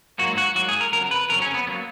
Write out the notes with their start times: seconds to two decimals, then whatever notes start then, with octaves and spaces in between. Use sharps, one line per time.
0.19 G#2 F#3 A#3 F#4
0.38 F#4
0.55 G#2 F#3 A#3 F#4
0.68 G#4
0.81 A#4
0.92 F2 C#3 F#3 A#4
1.11 B4
1.29 F2 C#3 F#3 A#4
1.42 C#4
1.54 B3
1.67 F#3 A#3 B3